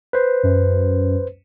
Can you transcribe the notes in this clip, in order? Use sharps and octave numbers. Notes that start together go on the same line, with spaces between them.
B4 C5
F#2